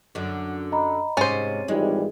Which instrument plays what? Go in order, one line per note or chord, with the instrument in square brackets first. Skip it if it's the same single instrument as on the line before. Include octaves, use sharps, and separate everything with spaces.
[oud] F#2 D3
[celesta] D#5 A#5 B5
[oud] G#2 C3 [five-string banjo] C#4 C5 [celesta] A6 D#7
[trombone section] G#1 E3 G3 [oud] G#3 [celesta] D#4 F4 D5